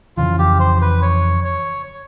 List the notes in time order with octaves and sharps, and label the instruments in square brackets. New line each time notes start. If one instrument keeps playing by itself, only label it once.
[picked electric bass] F2 C#3 E3 [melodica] F4
[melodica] G4
C5
B4
C#5
C#5